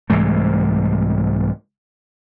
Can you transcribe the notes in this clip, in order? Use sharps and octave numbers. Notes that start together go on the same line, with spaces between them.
C2 G#2 E3 A3